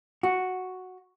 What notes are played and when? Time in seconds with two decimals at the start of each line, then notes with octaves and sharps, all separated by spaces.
0.23 F#4